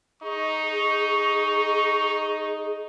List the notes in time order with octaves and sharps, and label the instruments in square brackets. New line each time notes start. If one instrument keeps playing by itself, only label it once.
[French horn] D#4 [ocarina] G#4 [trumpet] C#6